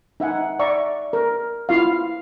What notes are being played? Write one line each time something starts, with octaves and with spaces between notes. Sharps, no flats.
D#4 E5 F#5 G#5
D5 E5 A#5 C#6
A#4
E4 F4 F5